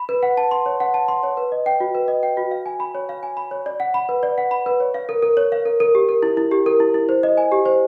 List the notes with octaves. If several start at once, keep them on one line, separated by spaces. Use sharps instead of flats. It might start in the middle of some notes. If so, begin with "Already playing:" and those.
Already playing: B5
B4
F#5
A5
C6
C#5
F#5
A5
C6
C#5
B4
D#5
G5
F#4
B4
D#5
G5
F#4
F5
G#5
B5
C#5
F5
G#5
B5
C#5
D5
F#5
B5
B4
D5
F#5
B5
B4
C#5
F5
A#4
A#4
C#5
F5
A#4
A#4
G4
A#4
E4
E4
G4
A#4
E4
E4
C5
D#5
G#5
G4
C5